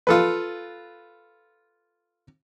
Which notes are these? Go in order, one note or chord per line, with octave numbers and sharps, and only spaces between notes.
F4 A4 B4